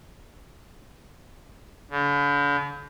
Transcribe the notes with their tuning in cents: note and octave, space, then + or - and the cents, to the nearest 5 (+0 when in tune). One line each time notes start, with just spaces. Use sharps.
D3 -45